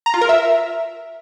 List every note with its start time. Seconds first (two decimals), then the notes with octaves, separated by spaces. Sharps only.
0.06 A#5
0.14 F4
0.21 A#4
0.29 E5